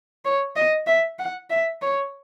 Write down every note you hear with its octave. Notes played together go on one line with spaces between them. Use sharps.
C#5
D#5
E5
F#5
E5
C#5